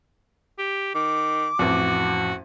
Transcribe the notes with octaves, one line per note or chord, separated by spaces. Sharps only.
G4
D#3 D6
A1 F2 F#4